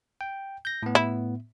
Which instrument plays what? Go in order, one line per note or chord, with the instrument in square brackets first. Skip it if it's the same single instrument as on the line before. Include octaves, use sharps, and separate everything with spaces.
[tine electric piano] G5
G6 A#6
A2 B3
[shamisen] E4